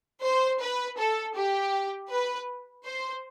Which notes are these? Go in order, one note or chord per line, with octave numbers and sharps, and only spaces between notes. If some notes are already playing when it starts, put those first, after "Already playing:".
C5
B4
A4
G4
B4
C5